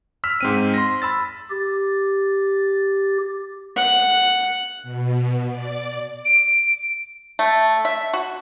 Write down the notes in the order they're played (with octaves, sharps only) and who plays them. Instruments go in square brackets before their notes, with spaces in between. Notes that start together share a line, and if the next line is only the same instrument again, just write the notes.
[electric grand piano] E6 F6 B6
G#2 C4 D#7
C6 A#6
B5 E6 A6
[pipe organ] G4 A6
[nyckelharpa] F#5
[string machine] B2
D5
[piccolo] D7
[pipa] A3
E5
F#4